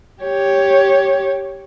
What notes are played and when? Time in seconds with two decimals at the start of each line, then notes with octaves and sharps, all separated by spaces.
0.22 G4 C#5